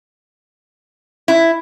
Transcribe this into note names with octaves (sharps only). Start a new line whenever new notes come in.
E4